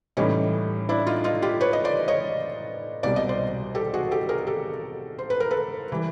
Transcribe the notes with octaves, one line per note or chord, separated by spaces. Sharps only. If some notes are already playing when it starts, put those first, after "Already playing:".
A2 E3 G3 C#4 D#4
D4 E4
D#4 F4
D#4 F4
F4 G4
B4 C#5
D#5
C5 D5
C#5 D#5
C2 B2 G3 D5
D#5
C5 D5
G4 A4
F#4 G#4
G4 A4
G#4 A#4
G4 A4
C5
B4
A#4
A4 B4
E3 G3